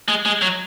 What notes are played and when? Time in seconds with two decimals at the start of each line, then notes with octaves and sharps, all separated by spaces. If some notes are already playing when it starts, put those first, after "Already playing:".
0.08 G#3
0.25 G#3
0.41 F#3